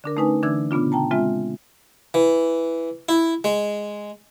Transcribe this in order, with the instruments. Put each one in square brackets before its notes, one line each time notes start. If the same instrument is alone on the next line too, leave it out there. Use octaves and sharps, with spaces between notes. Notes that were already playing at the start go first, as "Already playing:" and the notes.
[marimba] D3 D4 A#4
A3 C#4 D#4 B4 G#5
D3 E3 D4 E6 G#6
A#2 C#3 B3 D4 F4
G5 A5 A#5
G#3 C4 F4 E5
[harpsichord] E3
E4
G#3